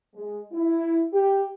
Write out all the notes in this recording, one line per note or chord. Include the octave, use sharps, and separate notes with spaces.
G#3
E4
G4